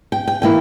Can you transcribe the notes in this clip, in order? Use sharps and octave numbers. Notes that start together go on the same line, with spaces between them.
G5
G5
E3 A#3 E4 G5